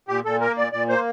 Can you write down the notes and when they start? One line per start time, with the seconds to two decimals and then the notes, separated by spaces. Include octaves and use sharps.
0.08 A#2 G4
0.25 A#2 A4
0.41 A#3 A#4
0.57 A#2 D5
0.72 A#2 D5
0.89 A#3 C5